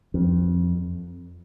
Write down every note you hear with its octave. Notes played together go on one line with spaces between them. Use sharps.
F2